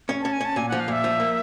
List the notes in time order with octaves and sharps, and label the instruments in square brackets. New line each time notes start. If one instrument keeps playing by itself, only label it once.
[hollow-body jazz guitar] C#4
[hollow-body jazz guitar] C#4 [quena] A5
[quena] G#5
[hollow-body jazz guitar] C#4 [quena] A5
[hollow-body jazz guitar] A#2 [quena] G#5
[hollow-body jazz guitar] F3 [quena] F#5
[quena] F5
[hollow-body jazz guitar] A#2 [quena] E5
[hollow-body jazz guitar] F3
A#3